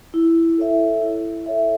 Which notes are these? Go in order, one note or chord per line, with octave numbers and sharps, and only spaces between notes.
E4
A4 C#5 E5
E4
A4 C#5 E5